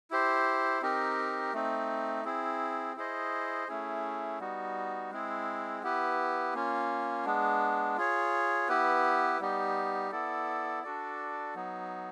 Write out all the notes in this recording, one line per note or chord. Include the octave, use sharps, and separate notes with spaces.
E4 G4 C5
C4 D#4 G4 A#4
A3 C4 D#4
C4 E4 G#4
E4 G#4 C5 D#5
A3 C#4 E4 G#4
G3 B3 D#4 F#4
G#3 C4 E4 G#4
B3 E4 G4 B4
A#3 C#4 F4
G#3 B3 D4
F4 G#4 C#5
B3 E4 G4 B4
G3 B3 D#4 G4
B3 E4 A4 D5
D4 F#4 A4 D5
F#3 B3 D#4